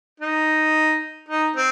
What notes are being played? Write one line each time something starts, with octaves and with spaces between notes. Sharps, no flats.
D#4
D#4
C4